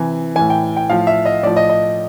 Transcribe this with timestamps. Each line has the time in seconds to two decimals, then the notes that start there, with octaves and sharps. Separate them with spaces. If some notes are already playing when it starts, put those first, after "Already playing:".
Already playing: C3 E3 G#5
0.36 A2 E3 G#5
0.50 G5
0.77 G5
0.90 A2 F3 F5
1.07 E5
1.25 D#5
1.43 A2 F3 D5
1.56 D#5
1.69 D#5